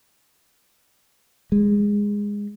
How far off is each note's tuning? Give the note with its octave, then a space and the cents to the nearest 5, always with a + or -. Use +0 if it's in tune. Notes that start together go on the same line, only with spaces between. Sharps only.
G#3 -15